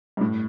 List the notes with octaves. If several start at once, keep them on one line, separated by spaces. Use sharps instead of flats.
G2
A2